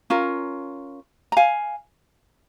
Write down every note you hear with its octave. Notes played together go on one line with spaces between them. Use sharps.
C#4 F4 A#4
A#5
F5 G#5